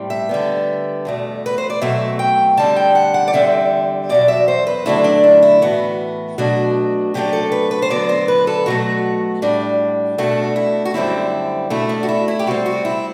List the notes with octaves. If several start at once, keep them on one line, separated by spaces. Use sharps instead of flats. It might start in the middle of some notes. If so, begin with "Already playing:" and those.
Already playing: A2 G3 C4
E5
D3 G3 B3
E2 B2 A3
B4
C5
D5
B2 F#3 A3 C4 E5
G5
D3 G3 C4 A5
G5
F#5
F#5
D5
E2 D3 G3 C4 E5
E2 B2 F#3 D5
E5
C5
B4
D3 F#3 A3 D4 E4
D4
E4
E4
A2 E3 B3 F#4
B2 F#3 A3 D4 F#4
C3 F#3 A3 D4 G4
A4
B4
B4
C5
D3 F#3 B3 D5
C5
B4
A4
B2 F#3 A3 F#4
A2 G3 D4
B2 A3 D4 F#4
E4
F#4
F#2 D3 G3 C4 E4
B2 A3 D4 E4
D4
F#4
E4
E4
G4
C3 G3 C4 F#4
F#4
E4